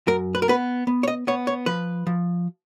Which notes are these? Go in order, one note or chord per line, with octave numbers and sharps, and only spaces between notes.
F#2 A#4
B4
A#4
B3 B4
B3
C#5
D#5
B3 C#5
C#5
F3 B4
F3